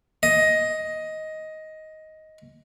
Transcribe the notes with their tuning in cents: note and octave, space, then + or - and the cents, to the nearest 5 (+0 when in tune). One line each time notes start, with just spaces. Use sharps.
D#5 +10